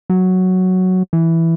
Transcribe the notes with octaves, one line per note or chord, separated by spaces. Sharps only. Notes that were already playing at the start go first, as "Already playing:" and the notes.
F#3
E3